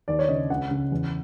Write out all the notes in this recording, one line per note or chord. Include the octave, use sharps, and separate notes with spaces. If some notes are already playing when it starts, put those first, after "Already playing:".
D#2 D5
C#5
C#3 D#5
C#2 F#5
C#3
E2